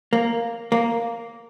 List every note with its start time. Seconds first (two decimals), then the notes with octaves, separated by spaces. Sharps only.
0.13 A#3
0.72 A#3